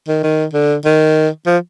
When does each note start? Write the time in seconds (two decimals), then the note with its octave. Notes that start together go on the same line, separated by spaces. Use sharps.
0.08 D#3
0.24 D#3
0.54 D3
0.85 D#3
1.46 F3